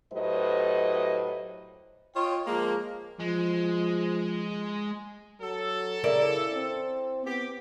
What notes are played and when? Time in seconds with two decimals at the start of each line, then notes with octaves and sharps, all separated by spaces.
0.13 A2 F#3 G4 B4 C5 D#5
2.15 F4 C#5 D#5 G5
2.47 F3 G#3 A#3
3.19 F3 G#3
5.41 F#3 A4
6.04 C#3 E4 A#4 D5
6.53 C4
7.26 B3 G4